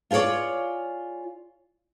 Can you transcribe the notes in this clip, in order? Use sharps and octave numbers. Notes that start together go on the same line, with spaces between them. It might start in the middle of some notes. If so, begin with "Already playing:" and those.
F4 G#4 B4 C#5 D5